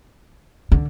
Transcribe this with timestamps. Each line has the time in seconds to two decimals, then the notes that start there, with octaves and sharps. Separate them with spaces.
0.72 D3